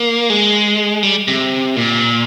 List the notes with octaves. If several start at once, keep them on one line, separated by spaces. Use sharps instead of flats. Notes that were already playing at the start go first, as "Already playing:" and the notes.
Already playing: A#3
G#3
G3
C3
A#2